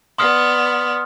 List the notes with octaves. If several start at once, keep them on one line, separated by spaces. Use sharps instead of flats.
B3 D5 C6 D#6 F6